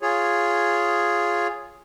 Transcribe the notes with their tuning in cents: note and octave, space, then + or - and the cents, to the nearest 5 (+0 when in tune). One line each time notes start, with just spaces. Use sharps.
F4 +0 G#4 +0 C#5 +0